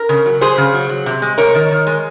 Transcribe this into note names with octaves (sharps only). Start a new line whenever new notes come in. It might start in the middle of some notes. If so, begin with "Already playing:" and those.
Already playing: A#4
C#3
F#3
F#3 G#4 C5
C#3
F#3
F#3
C3
G#3
C3 A#4 C#5
D#3
D#3
G#3